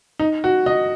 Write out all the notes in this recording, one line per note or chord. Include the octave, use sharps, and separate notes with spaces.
D#4
F#4
D#5